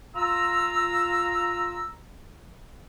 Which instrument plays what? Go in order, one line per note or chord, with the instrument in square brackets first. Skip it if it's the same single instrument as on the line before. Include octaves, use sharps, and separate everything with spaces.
[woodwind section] F4 A#5 E6